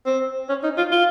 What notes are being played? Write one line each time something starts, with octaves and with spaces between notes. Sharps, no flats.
C4
C#4
D#4
F4
F4